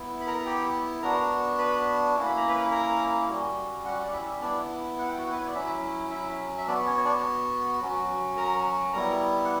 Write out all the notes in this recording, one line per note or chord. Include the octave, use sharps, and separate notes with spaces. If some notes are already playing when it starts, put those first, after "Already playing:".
Already playing: B3 E4
B5
A#4 A#5
A#5
G4 G5
B3 D4 F#4 A#4 A#5
B4 B5
A#3 C#4 E4
B5
A#5
B4 B5
A#4 A#5
G3 C#4 F#4
F#4 F#5
D5
E4 E5
B3 D4 E4 D5
F#5
G5
F#4 F#5
B4
C#5
D5
F#3 C#4 E4 E5
E4 E5
E5
B3 D4 F#4 D5
C#4 C#5
C#5
D4 D5
F#3 C#4 F#4
A#4 A#5
G3 B3 E4 A#4 A#5
F#5